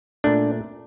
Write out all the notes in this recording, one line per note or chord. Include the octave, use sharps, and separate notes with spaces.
A#2 A3 D4